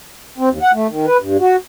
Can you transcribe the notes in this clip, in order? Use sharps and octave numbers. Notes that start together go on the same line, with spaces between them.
C4
D#2
F#5
A3
D#3
B4
G2
F#4